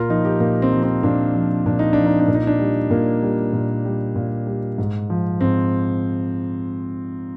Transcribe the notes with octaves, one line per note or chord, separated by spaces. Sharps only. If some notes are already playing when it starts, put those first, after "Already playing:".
Already playing: A#2 F4 A#4
F3 D#4
G4
A#2 A#3
C4
F3
C4
A#2 D4
F3
A#2 D4
D#4
F3 D4
D#4
D4
A#2
D#4
D4
G3
A#2 A#3
G3
A#2
G3
A#2
G3
G#2
F3
G#2 C4